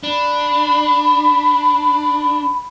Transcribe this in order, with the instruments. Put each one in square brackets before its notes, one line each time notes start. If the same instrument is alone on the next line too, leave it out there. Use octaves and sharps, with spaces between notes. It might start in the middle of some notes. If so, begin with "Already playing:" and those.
[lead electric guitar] D4 [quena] B5